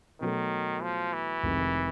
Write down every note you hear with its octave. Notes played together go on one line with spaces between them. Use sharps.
B2 D#3 F#3 A3
F3
E3
F1 F2 C3 D#3 G#3